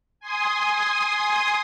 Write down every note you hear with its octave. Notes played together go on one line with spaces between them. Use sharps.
G#5 C6 D#6